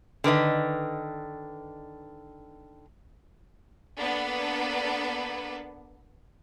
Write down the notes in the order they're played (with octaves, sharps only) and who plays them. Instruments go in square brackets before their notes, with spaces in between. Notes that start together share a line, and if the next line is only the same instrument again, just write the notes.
[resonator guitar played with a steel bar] D3 D#3 B4 D#5
[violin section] A#3 B3 D4 A4 B4